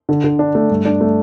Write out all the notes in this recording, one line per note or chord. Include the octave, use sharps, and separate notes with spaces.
D3
D3
D4
A3
G2
D4
A3